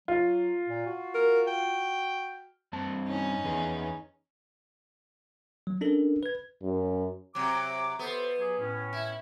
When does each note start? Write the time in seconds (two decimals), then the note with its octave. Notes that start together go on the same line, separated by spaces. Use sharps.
0.08 F#3 F4
0.69 A#2
0.86 F#4
1.14 A#4
1.47 G5
2.73 G2 C4 A5
3.07 C#4 D#4
3.44 E2 B3 G#4
5.67 F#3
5.81 C#4 D4 A4 A#4
6.23 B4 G#6
6.62 F#2
7.35 C3 F#3 D6
7.99 B3 G4 A4 C5
8.38 F#3 G4 G#4
8.58 A2 C#4
8.93 E4